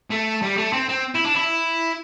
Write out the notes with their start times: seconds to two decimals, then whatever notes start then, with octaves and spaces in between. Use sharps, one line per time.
0.10 A3
0.42 G3
0.57 A3
0.73 C4
0.89 C4
1.15 E4
1.24 D4
1.35 E4